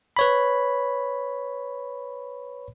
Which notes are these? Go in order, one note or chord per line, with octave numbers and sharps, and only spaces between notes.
B4 C#5 B5